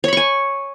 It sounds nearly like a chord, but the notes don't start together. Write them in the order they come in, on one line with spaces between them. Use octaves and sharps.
C#5 B5 C#6 G#5